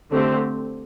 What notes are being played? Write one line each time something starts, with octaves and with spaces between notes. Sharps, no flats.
D3 A3 C4 G4